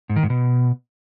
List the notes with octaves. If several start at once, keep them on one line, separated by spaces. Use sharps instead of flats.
G#2
D#3
G#2
B2